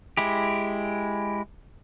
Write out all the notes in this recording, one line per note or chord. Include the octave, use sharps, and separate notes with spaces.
G#3 E4 G4